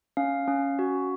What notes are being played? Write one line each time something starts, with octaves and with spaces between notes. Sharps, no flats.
C#4 F5
C#4
F#4